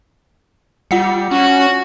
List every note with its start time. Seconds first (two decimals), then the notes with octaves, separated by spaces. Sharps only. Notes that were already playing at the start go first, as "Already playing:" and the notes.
0.91 G3 F4 F#5 C#7
1.31 C#4 F#4